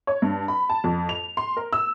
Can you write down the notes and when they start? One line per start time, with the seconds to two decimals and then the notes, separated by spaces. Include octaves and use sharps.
0.07 C#5
0.22 G2
0.48 B5
0.69 A5
0.84 F2
1.09 F7
1.37 C6
1.57 A#4
1.73 E6